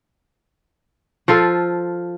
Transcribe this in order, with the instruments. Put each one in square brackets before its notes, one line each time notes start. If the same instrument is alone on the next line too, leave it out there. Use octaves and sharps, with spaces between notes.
[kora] F3 F4 A4